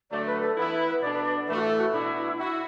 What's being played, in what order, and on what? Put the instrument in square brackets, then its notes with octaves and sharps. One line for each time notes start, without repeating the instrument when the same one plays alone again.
[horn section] D3 F#3 A3 [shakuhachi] D5
[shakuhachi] B4
A4
[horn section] E3 B3 E4 [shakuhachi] B4
[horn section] B2 B3 D4 A4 [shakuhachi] D5
[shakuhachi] B4
D5
[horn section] A2 E3 A3 [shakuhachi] B4
[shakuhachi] F#4
A4
F#4
[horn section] B2 B3 D4 F#4 [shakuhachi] E4
[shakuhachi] E4 [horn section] F#4